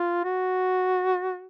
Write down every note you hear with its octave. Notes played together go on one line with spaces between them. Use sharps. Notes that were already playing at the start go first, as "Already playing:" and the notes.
Already playing: F4
F#4